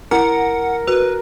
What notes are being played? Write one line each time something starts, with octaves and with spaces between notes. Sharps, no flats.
E4 A#4 F#5
F#4 B4